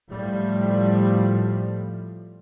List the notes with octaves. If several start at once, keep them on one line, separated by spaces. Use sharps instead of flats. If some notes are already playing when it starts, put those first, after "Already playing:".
A2 F3 G3 A3